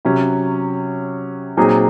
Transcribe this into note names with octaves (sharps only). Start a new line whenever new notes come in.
C3 F#3 C#4
A#2 F#3 C4 D#4 G#4